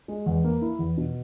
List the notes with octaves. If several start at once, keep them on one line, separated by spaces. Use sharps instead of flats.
G#3
E2
A#3
E4
E2
B2